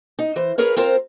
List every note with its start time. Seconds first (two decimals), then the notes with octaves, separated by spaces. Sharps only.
0.19 D#4
0.36 E3 C5
0.58 G#4 A#4 B4 C#5 F5
0.76 C4 F4 A#4 C5